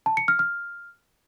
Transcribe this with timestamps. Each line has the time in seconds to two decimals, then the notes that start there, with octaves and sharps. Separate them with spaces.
0.06 A5
0.17 C#7
0.28 F6
0.39 F6